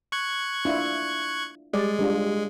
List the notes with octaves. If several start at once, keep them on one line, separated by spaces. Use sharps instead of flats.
C#6 F#6 G#6
D4 E4 F4
G3 G#3 D5
G3 D4 F4